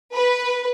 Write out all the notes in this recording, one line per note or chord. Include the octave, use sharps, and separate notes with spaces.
B4